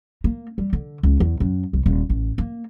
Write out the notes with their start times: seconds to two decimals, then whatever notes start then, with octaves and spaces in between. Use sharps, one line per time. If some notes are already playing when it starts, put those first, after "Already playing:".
0.24 A#3
0.58 G3
0.73 D3
1.03 C#2
1.20 E2
1.40 F#2
1.73 C2
1.86 D#1
2.09 A1
2.38 A#3